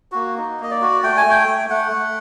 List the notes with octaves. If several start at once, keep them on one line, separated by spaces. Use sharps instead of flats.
A#3 F#4
D#4
A#3 D#5
D5
F#4
A3 G5
G#5
A3 G5
A3
A3 F#5
A3